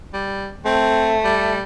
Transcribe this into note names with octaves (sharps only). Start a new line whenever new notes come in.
G3
A3 C4
G3